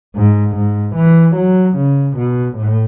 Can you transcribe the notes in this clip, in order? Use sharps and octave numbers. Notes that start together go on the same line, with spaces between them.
G#2
G#2
E3
F#3
C#3
B2
A2